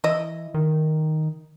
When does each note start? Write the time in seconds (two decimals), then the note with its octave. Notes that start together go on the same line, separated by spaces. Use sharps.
0.04 E3 E4 D#5
0.54 D#3